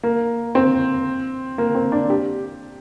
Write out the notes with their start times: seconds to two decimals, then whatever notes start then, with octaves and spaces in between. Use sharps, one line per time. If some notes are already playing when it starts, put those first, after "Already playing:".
0.03 A#3
0.55 C4
1.58 A#3
1.75 C4
1.92 D4
2.10 G4